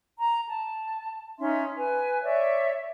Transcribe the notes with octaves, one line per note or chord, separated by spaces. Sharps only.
A#5
A5
C#4 D#4 E5 C6
B4 G#5
C#5 D5 E5